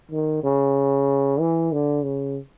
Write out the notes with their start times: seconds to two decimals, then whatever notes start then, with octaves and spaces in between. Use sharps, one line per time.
0.12 D#3
0.44 C#3
1.40 E3
1.72 D3
2.04 C#3